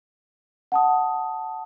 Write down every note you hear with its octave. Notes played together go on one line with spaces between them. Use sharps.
F#5 A5 D#6